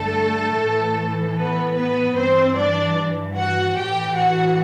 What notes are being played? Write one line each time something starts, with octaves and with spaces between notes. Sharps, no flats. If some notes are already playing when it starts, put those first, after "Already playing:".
Already playing: G2 D3 A3 A4
A2 E3
B3 B4
B3 B4
G2 E3 C4 C5
D4 D5
F#4 F#5
A2 E3 G4 G5
F#4 F#5